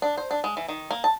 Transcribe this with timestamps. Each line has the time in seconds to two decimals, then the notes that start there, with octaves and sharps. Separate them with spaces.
0.02 D4
0.17 C5
0.31 D4
0.44 G#3
0.57 E3
0.68 D#3
0.91 A#3
1.04 A5